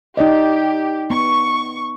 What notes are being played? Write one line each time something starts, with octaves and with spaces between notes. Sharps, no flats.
D#4 G4 D5 D#5
B3 C#6